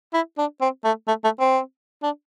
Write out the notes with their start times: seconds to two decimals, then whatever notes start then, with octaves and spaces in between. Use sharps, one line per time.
0.14 E4
0.38 D4
0.61 C4
0.84 A3
1.08 A3
1.24 A3
1.40 C4
2.03 D4